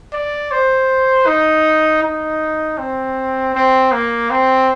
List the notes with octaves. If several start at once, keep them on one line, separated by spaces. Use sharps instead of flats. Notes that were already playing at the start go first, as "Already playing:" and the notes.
D5
C5
D#4
D#4
C4
C4
A#3
C4